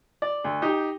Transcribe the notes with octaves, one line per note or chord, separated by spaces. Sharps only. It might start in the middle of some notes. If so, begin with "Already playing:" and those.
D5
D2
D#4 G4